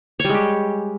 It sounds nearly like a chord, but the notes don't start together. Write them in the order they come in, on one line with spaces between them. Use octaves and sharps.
C#5 G3 G#3 G4